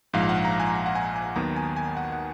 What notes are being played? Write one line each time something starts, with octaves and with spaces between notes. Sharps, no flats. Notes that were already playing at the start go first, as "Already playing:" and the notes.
A#1 G#2 F3 F5
F#5
A#5
G#5
A#5
F#5
G#5
G#5
D#2 D#3 F#3 B3 A#5
G#5
G#5
F#5
F#5